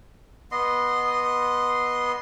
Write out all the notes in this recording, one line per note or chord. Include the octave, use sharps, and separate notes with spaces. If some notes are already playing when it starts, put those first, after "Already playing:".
B3 D#5 C6